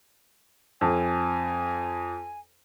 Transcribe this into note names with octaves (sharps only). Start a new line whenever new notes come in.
F2 G#5